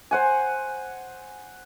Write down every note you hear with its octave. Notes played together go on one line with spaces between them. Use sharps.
C5 F#5 G#5